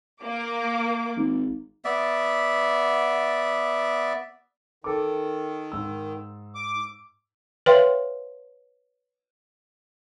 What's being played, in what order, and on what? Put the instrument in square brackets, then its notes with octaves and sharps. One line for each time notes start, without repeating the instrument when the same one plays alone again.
[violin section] A#3 D6
[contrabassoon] G#1
[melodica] B3 D5 E5
[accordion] D#3 [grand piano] A4 D6
[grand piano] G#2 E6
[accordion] D6
[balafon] B4 C#5 E5 F5 G5 C6